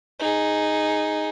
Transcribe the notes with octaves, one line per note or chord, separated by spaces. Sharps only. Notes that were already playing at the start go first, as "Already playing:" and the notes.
D#4 G#4